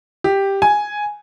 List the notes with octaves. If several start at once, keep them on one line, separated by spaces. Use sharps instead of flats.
G4
G#5